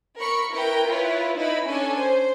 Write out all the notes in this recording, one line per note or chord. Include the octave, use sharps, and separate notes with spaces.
A#4 B5 C#6 C#7
E4 A#4 B4 G5
E4 F4 B4 C#5
D#4 E4 B4 B5
C#4 D4 A4 G#5
C5